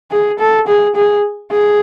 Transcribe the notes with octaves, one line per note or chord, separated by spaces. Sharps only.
G#4
A4
G#4
G#4
G#4